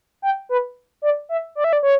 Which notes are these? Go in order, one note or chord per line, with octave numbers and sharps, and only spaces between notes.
G5
B4
D5
E5
D5
E5
D5
C#5